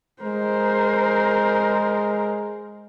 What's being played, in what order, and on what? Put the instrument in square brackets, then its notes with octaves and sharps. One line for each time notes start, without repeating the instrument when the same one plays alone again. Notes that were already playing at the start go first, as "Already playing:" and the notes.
[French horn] G#3 [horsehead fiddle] A#4 C5